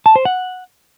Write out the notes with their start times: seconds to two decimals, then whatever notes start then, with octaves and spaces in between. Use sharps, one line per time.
0.06 A5
0.16 C5
0.25 F#5